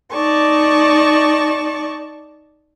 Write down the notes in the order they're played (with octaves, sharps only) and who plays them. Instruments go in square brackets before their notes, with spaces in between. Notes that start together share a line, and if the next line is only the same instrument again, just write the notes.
[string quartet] D#4 D5 A5 C#6